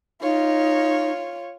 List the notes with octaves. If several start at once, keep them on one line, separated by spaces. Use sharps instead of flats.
D#4 F4 C#5